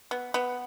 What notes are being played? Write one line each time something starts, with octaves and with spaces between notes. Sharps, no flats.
B3
B3